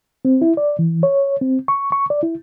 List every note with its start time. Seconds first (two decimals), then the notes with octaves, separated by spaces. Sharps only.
0.25 C4
0.41 E4
0.57 D5
0.79 E3
1.03 C#5
1.41 C4
1.68 C#6
1.92 C#6
2.10 D5
2.23 E4